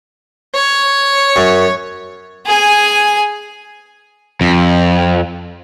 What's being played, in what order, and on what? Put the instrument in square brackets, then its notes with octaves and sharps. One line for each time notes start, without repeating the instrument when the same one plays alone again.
[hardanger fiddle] C#5
[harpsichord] F#2
[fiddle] G#4 G#5
[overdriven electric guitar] F2